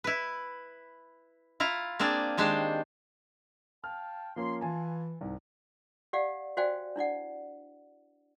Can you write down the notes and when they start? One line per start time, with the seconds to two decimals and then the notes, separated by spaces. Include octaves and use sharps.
0.04 E4 B4
1.60 E4 F4 A#5
1.99 A#3 C4 D4 G#4 D5
2.37 D#3 G#3 D4 G4 C5
3.84 F5 G5 A5 F6
4.36 F3 A#3 C#4 C6
4.61 E3 F4 G#5 A5
5.21 C2 G#2
6.13 G4 D5 F5 F#5
6.57 F#4 C5 D5 F5 G5 G#5
6.96 D4 E4 D5 F#5